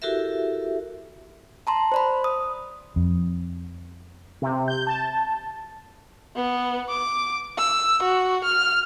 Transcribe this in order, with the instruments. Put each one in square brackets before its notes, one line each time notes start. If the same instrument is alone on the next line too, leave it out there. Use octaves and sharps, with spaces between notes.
[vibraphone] E4 F#4 G4 A4 A#4 E5
[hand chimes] A5 A#5 C6
C5 D5 B5
D#6
[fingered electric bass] F2
[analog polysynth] C3
G6
A5
[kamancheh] B3
D6
E6
F#4
F6